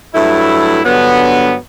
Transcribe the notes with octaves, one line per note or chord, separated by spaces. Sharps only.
G2 F#3 A3 E4
G2 D3 F#3 B3